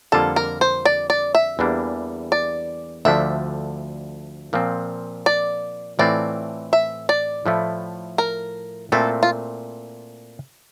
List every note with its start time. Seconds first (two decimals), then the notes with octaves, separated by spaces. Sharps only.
0.12 F2 D3 G3 A#3 F4 A4
0.36 A#4
0.61 C5
0.85 D5
1.10 D5
1.35 E5
1.59 E2 E3 G3 A#3 D4
2.32 D5
3.05 D2 D3 F3 A3 D4 E5
4.53 A#2 F3 C4
5.26 D5
5.99 A2 E3 A3 C4 F4 D5
6.73 E5
7.09 D5
7.46 A2 F3 A3 E4
8.18 A#4
8.92 A#2 A3 C4 E4 A4
9.23 F4